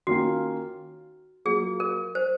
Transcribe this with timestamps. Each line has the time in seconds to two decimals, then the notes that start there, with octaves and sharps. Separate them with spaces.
0.07 D#3 A#3 C#4 F4 F#4
1.45 F#3 A#3 F4 G#4
1.80 A#4
2.15 C5